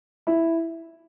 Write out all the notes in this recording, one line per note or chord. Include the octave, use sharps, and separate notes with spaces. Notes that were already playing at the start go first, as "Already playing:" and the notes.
E4